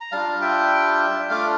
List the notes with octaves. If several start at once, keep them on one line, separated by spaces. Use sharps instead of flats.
A#5
G3 D4 F4 F5 A5
E5 G5
A3 D4 F4 D5 F5